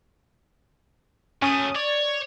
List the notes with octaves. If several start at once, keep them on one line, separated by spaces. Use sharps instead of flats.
F#2 A3 C#4 D#6 D#7
C#5 D5